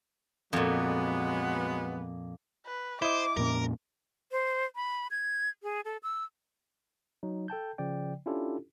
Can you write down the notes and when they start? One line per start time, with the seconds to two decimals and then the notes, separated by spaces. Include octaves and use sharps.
0.53 F2 A#2 F#3 G#3 B3
2.66 B4
3.02 E4 C5 D#5 D6
3.37 F2 A#2 C#4 A#4
4.32 C5
4.76 B5
5.11 G#6
5.63 G#4
5.85 A4
6.03 E6
7.23 F#3 D#4
7.48 A4 G5 A5 G6
7.78 C#3 F3 D5 G5
8.26 C#4 D4 E4 F4 G4 A4